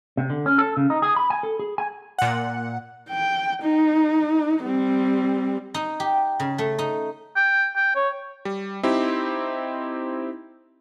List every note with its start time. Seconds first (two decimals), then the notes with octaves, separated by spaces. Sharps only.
0.17 C3
0.30 D3
0.46 C#4
0.58 A4
0.77 C#3
0.90 D#4
1.02 G#4
1.16 B5
1.30 G#5
1.43 A4
1.59 G#4
1.78 G#5
2.18 A#2 F#5
3.10 G5
3.63 D#4
4.64 G3 C4
5.74 D#4
6.00 G4
6.40 C#3
6.58 A3
6.79 D#4
7.36 G5
7.76 G5
7.96 C#5
8.45 G3
8.83 C4 D#4 E4 G4